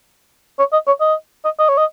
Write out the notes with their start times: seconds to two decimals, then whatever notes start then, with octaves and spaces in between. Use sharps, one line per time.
0.59 C#5
0.73 D#5
0.87 C#5
1.01 D#5
1.45 D#5
1.59 D#5
1.69 C#5
1.77 D#5